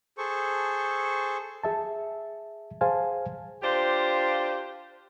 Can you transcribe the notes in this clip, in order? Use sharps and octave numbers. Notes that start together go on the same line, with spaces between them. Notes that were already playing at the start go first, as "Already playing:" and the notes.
G#4 A4 C5 C#6
G#4 E5 A5
G#4 C5 F5 G#5 A5
D4 F4 G4 C5